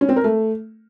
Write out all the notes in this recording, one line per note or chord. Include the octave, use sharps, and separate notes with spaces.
C#4
C4
A#4
A3